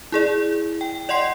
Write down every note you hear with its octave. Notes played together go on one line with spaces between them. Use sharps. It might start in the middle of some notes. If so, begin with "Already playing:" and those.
E4 G#4 D5
G5
D5 D#5 F#5 C6 C7